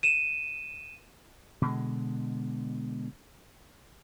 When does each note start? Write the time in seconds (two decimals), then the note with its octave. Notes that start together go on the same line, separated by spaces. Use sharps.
0.03 D#7 E7
1.62 B2 D3 G#3